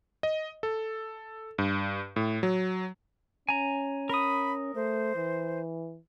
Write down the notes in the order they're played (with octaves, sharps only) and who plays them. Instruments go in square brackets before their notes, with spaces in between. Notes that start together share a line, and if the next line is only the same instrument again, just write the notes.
[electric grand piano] D#5
A4
G2
A2
F#3
[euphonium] C#4 [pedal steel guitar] G#5 A#5
[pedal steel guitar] A#4 D#6 [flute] B5
[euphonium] A3 [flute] C5
[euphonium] E3